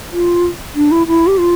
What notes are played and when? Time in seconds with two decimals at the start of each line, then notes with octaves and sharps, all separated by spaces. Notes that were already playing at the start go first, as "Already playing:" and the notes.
0.12 F4
0.75 D4
0.91 E4
1.07 E4
1.27 G4
1.38 F4